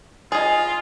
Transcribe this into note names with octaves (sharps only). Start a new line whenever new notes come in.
F4 G#4 D#5